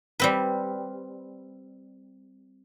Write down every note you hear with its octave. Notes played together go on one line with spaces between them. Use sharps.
G3 C4 B4